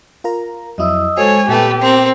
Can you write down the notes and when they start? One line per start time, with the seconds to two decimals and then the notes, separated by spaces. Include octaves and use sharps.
0.24 F4 A#4 A#5
0.78 F2 F#3 E4 D#5 D#6 E6
1.17 G#3 F#4 A4 C5 C#5 G#5
1.48 A#2 A3 B3 G4 B4 G5
1.81 C4 A#4